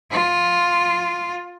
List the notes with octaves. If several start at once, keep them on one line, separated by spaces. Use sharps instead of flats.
F4